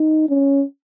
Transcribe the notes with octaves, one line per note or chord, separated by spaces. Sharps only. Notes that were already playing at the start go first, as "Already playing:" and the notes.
Already playing: D#4
C#4